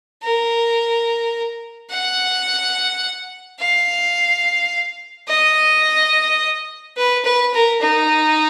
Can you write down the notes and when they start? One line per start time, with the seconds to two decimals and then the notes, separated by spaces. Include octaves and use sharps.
0.23 A#4
1.91 F#5
3.60 F5
5.29 D#5
6.97 B4
7.25 B4
7.54 A#4
7.82 D#4